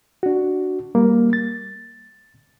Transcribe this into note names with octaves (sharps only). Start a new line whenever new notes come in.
D4 F#4
G3 A#3
A6